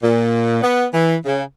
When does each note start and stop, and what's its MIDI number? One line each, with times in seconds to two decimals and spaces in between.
0.03 0.61 46
0.63 0.86 59
0.93 1.15 52
1.25 1.43 49